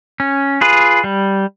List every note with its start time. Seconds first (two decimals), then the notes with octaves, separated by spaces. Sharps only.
0.20 C#4
0.61 F4 G#4 B4
1.04 G3